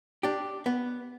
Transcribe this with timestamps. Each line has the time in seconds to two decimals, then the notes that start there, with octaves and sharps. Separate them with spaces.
0.23 D4 G4
0.66 B3